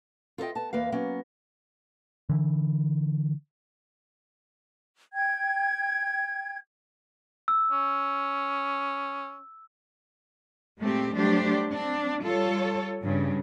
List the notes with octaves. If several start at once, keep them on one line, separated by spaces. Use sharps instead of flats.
F4 A4 C5 D#5 G5
B3 A5
E2 A#3 B4 F5
F#3 A#3 B3 C#4
D3 E3
G5 G#6
E6
C#4
A#2 G#3 A3 C4 G4
F#3 G3 A3 D4 G4 C5
C4 D4
G3 F4 A4 C#5
G2 C#3